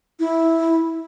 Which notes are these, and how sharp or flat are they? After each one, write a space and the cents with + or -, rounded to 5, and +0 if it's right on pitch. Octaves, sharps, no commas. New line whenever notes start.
E4 -5